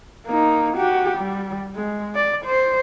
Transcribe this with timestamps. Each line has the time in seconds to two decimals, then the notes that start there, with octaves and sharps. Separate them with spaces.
0.26 A#3 D#4
0.77 F#4 G4
1.18 G3
1.75 G#3
2.15 D5
2.45 C5